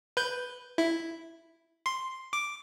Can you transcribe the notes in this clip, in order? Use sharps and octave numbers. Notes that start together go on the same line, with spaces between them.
B4 G6
E4
C6
D6